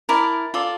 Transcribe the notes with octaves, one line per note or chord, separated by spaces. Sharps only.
E4 A#4 D5 A5
F4 A4 D5